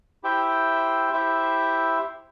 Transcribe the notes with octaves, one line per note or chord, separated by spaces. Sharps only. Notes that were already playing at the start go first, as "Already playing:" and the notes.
E4 G4 C5 E5 G5
E4 G4 C5 E5